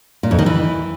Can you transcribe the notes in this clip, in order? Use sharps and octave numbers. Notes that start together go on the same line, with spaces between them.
A#2
F2
D#3
E3